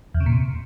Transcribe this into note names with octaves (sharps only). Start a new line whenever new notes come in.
E2
C#3
A#2
C3